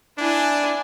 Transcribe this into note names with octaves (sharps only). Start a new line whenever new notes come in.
D4 E4 G#5